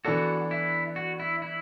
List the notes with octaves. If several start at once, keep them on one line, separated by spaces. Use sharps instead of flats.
E3 B3 D4 F#4 A4
E4
F#4
E4
E4